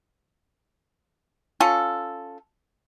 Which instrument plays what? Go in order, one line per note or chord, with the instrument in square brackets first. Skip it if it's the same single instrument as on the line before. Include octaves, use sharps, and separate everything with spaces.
[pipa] C#4 F4 A4